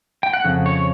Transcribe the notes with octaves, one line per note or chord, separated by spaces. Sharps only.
G5
F#5
F2 C#3
C#5